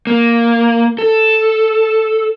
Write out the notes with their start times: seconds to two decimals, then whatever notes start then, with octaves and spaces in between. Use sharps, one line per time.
0.07 A#3
0.99 A4